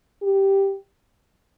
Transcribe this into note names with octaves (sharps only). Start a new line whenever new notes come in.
G4